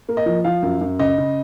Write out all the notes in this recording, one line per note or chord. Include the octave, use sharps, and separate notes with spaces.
A#3
D#5
F3
F3 F5
F#2
F#2
C#3 D#5
C#3